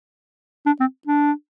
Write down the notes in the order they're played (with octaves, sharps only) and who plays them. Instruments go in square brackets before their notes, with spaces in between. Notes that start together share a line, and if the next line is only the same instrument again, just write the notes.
[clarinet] D4
C4
D4